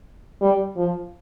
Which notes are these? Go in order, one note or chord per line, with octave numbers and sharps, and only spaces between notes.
G3
F3